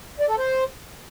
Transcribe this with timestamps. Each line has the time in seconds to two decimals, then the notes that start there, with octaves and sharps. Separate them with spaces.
0.20 D5
0.29 A4
0.38 C5